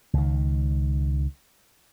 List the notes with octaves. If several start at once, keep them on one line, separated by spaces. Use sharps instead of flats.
C#2 D#3